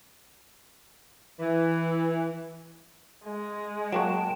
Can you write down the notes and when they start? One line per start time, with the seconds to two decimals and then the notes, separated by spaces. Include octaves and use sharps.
1.39 E3
3.25 G#3
3.92 F#3 A#3 F#4 G5 A5